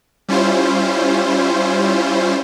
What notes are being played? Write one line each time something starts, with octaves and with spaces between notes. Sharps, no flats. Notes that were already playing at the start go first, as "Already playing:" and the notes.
G3 C#4 E4 F4 C5